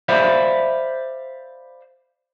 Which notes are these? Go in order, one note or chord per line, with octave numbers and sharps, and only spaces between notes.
C5 D5 E5 F5 B5